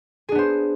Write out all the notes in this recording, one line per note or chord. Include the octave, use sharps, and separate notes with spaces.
B3 D4 G#4 C5